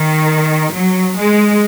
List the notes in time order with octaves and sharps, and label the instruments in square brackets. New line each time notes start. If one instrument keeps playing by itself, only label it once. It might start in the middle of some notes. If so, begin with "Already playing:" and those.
Already playing: [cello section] D#3
F#3
G#3